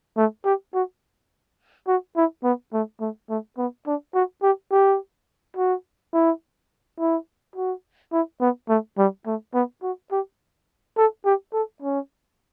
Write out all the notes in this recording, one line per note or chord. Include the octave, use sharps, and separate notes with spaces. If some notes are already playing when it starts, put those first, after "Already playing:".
A3
G4
F#4
F#4
E4
B3
A3
A3
A3
B3
D4
F#4
G4
G4
F#4
E4
E4
F#4
E4
B3
A3
G3
A3
B3
F#4
G4
A4
G4
A4
C#4